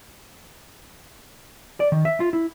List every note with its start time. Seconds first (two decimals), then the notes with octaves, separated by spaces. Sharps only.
1.80 D5
1.92 D#3
2.05 E5
2.20 F4
2.33 E4